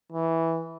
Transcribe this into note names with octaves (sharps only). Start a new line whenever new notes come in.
E3